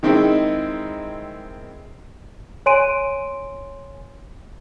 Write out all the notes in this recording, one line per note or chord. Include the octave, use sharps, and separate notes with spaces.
D#3 G#3 C4 D#4 E4
C#5 G#5 C6 D7 D#7